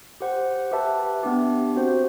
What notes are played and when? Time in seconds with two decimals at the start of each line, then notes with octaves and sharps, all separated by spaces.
0.20 G4 C5 F#5
0.71 G4 B4 E5 A5
1.23 B3 D4 G4
1.75 C4 F#4 C5